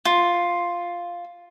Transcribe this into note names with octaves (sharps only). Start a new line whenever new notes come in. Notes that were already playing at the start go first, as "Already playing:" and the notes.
F4